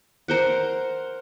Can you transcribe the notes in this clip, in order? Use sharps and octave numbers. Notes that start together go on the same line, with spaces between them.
A#4 C5 F#5